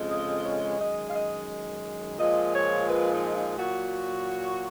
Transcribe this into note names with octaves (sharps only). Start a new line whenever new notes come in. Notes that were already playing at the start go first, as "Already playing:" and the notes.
Already playing: F2 C#3 G#3
D#5
C#5
F#2 D#3 G#3 D#5
F5
D#5
A#2 F3 G#3 D#5
C#5
B4
D#4
D#4
A#2 F#3 F#4